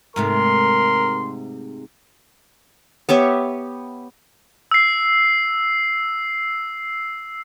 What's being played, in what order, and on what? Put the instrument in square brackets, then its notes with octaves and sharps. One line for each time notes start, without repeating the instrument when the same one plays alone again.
[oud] G#2 C3 A3 [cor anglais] A#4 [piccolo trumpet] C6
[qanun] B3 G4 C#5 E5
[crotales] E6 C7